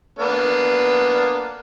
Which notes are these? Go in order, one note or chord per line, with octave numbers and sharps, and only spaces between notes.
A#3 B3 D4